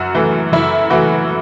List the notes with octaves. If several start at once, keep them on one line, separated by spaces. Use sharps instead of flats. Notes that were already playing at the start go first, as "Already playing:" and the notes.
Already playing: F#2 F#4
E3 A3
F#2 E4
E3 A3 F#4